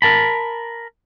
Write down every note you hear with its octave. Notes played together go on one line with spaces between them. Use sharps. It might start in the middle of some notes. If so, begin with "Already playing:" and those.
A#4 A5 B5